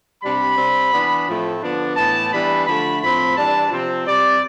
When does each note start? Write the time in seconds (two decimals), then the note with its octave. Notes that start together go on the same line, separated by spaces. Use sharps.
0.23 C3 G3 D4 B5
0.58 C3 G3 C4
0.93 E3 B3 D4
1.27 A2 F3 A3 C4
1.62 D3 F3 B3 D4
1.96 A2 E3 B3 A5
2.32 E3 G3 B3 D4 B5
2.66 D3 F3 A3 B5
3.01 A2 F3 C4 B5
3.36 E3 G3 D4 A5
3.71 C3 F3 C4
4.06 C3 G3 C4 D5